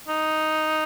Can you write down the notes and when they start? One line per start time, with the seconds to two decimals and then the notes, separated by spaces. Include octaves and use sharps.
0.08 D#4